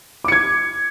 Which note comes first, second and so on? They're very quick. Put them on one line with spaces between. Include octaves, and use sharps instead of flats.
D6 C#7 G#6